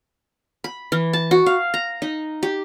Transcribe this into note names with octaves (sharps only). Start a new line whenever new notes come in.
B5
E3
A5
F#4
F5
A#5
D#4
G4